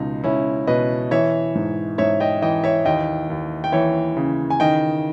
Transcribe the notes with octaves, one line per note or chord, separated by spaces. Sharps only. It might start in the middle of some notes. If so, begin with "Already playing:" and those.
Already playing: C#2 B2 D#4
C#2 C#4 E4
B2 B4 D#5
E3 C#5 E5
G#2
G#2 C#5 E5
D#5 G5
E3 D#5 G5
C#5 E5
D#2 D#5 G5
D#2
G5
E3 C#5 E5
C#3
G#5
D#3 D#5 G5